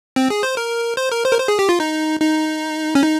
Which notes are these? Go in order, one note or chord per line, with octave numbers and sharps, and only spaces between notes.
C4
G#4
C5
A#4
C5
A#4
C5
A#4
C5
G#4
G4
F4
D#4
D#4
C#4
D#4